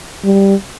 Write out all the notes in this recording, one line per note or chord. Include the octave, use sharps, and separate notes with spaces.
G3